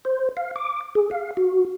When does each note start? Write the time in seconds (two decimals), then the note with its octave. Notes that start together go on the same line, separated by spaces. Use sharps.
0.05 C5
0.37 F5
0.56 D6
0.95 G#4
1.11 F5
1.37 F#4